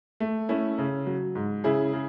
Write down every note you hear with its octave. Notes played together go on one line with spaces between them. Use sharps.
A3
A3 C#4 E4
C#3
F#3
G#2
C#3 E4 G#4
C#3